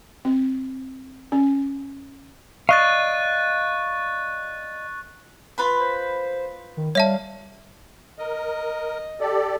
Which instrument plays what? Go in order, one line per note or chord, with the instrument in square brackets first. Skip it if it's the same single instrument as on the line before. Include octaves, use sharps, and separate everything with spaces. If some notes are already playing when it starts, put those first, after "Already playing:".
[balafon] C4
C#4
[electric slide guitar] D5 D#5 F5 [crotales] C#6 F#6 A6
[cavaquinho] F4 B4 B5
[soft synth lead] C5
D#3
[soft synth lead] G3 [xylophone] C#5 E5 A5 [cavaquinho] F5
[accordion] A#4 [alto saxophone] D#5
[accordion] G4 A4 D5